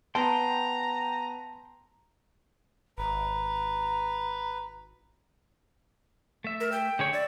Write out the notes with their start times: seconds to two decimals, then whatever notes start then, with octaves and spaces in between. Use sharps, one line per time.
0.15 B3 G5 A5 A#5 C6
2.98 G#1 B4 A#5
6.44 A3 E5
6.60 A#4
6.72 G5
6.99 D3 G#4 C#5
7.13 D5 E5